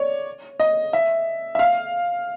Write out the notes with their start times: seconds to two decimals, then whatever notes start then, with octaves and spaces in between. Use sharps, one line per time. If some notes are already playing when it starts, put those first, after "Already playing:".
Already playing: C#5 D5
0.60 D#5
0.93 E5
1.55 E5
1.59 F5